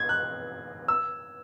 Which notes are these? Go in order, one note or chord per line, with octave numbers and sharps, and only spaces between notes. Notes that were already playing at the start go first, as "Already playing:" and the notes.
Already playing: G#6
F#6
E6